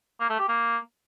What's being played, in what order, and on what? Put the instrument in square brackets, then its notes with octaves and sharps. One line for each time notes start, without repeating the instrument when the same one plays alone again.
[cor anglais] A#3
A3
G4
A#3